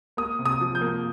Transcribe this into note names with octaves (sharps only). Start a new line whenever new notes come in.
A#3 D#6
C3
D#6
F3
G6
A#3